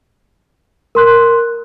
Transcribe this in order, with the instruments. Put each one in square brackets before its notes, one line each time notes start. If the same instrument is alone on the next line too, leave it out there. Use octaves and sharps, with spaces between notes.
[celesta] A#4 C6 F#6